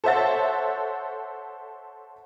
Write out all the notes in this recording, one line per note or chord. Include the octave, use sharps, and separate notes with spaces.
A4 C5 C#5 E5 F#5 A6